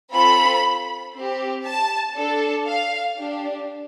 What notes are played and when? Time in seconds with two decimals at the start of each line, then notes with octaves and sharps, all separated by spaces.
0.12 C4 F4 A4 B5
1.14 C4 G4
1.66 A5
2.16 D4 A4
2.67 F5
3.18 D4 G4